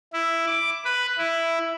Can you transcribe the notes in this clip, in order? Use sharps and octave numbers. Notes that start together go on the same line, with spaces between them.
E4
D6
B4
E4